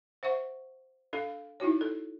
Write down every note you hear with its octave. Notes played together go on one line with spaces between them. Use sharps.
C5 E5 F#5 C#6
D4 A4 F5
D#4 E4 F#4 C#5
A4